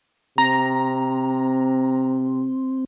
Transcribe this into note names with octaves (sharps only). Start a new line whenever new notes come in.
C3 C4 A#5